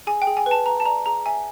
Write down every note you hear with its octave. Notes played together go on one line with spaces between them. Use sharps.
G#4 G#5
G5
G#4
G#5
B4
A5
B4 A#5
A5
D5 A#5
G#4 A#5
E5 G#5